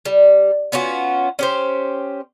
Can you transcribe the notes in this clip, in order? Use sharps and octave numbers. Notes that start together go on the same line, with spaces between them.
G3
B3 C#4 F4 F#4
C#4 G4 C5